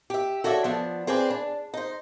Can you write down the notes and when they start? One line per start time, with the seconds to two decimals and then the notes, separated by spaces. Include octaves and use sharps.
0.10 G4 E5
0.44 F#4 A4 C#5 D5 E5
0.64 F3 B3 D4
1.07 C4 G#4 B4 C5 D5
1.30 D4
1.74 D#4 C5